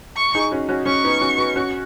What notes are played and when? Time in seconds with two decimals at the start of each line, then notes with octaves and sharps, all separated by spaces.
0.17 C#6
0.35 D#4 G#4
0.51 C#4 F#4
0.69 C#4 F#4
0.86 C#4 C#6
1.04 B3 D#4
1.21 C#4 F#4
1.38 F#4 B4
1.56 C#4 F#4